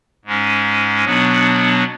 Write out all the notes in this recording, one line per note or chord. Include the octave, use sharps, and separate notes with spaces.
G#2 G#3 C#4
B2 F#3 B3 D4